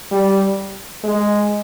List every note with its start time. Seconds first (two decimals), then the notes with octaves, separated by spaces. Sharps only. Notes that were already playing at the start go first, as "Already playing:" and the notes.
0.11 G3
1.04 G#3